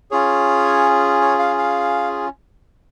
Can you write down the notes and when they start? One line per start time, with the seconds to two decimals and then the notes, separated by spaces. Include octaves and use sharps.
0.11 C#4 F4 G#4 C#5
1.21 C#5
1.39 F5
1.58 F5